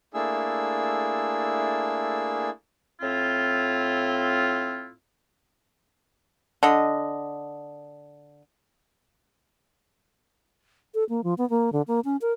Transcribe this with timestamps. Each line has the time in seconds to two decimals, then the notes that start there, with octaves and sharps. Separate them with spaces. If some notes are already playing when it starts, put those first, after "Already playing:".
0.14 A3 A#3 D4 E4 G#4 E6
3.01 A2 C4 E4 F4
6.63 D3 D#5
10.94 A4
11.09 A#3
11.24 F3
11.38 B3
11.50 A#3
11.73 D3
11.88 A#3
12.05 C#4
12.22 A#4